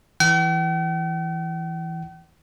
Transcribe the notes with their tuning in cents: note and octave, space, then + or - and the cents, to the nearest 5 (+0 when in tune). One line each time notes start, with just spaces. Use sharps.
E3 +0 G5 -45